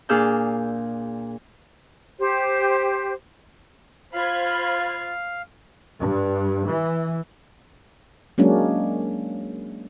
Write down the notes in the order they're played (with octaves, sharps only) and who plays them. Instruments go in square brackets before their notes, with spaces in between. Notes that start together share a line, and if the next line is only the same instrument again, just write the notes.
[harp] A#2 D4 G#4 F5 E6 G6
[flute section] G4 C5
[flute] F4 [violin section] C5 B5 G#6 [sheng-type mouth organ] F5
[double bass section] G2
E3
[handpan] F#3 G#3 A#3 C#4 D4